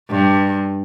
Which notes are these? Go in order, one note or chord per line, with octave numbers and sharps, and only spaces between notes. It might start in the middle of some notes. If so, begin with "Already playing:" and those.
G2